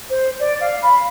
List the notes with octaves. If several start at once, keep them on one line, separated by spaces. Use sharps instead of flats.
C5
D5
F5
B5